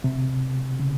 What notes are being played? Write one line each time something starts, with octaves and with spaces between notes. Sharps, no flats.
C3
C#3